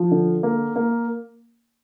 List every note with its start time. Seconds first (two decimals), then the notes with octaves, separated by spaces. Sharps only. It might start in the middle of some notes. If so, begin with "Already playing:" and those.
Already playing: F3
0.11 D3
0.43 A#3
0.76 A#3